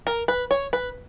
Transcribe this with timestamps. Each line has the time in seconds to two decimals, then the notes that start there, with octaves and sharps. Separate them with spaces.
0.07 A#4
0.28 B4
0.51 C#5
0.73 B4